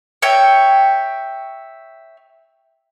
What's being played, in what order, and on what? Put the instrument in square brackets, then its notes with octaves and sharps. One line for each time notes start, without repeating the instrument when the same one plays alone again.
[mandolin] C#5 E5 G5